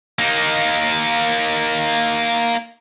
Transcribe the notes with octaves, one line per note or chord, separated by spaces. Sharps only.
A#3 D#4